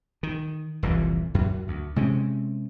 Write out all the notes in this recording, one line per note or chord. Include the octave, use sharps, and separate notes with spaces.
D#3
F1 C2 A#2 E3
F#2
D2
C3 G#3 C4 C#4